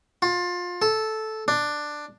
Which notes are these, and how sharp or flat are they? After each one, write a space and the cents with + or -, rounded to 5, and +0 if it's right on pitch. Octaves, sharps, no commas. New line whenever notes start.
F4 +25
A4 -10
D4 +10